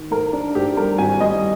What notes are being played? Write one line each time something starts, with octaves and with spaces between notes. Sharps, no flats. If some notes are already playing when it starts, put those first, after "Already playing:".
Already playing: D#3
G#2 A#4
D4
G#2 G4
G3 A#4
G#1 G#5
G3 D#5